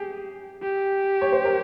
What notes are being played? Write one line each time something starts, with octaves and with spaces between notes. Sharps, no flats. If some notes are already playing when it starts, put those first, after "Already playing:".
Already playing: G4 G#4
G4
C#5
C5
A#4